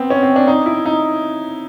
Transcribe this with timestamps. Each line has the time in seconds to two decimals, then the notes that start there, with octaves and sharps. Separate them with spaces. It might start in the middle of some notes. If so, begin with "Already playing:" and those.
Already playing: B3 C4
0.10 C#4
0.23 C4
0.36 D4
0.47 D#4
0.66 E4
0.86 D#4